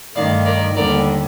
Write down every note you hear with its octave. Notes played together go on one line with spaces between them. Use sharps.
G2 D#3 A3 D5 F5
A#4 D5
D#2 D3 G3 A#4 D5